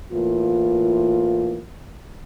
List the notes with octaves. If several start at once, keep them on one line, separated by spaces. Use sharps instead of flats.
A2 E3 A#3 F4